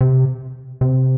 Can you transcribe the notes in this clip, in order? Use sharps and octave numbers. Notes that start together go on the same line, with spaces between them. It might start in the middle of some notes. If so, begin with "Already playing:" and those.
C3
C3